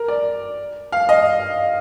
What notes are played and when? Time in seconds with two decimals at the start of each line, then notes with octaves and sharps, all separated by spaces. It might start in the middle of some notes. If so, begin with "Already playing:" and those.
Already playing: A#4
0.08 D5
0.92 F5
1.09 D#5